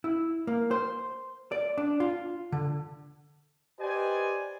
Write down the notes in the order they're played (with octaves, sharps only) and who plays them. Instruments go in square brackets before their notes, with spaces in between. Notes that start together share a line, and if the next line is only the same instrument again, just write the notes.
[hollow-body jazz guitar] E4
A#3
C5
D5
D4
F4
D3
[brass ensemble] G4 B4 C5 D5 D#5 G#5